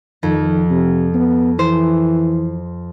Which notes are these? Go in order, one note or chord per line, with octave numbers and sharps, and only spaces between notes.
F2 D#3
C3
B3
E3 C5